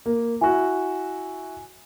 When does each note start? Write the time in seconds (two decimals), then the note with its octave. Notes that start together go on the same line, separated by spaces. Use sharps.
0.06 A#3
0.41 E4 F#4 G#5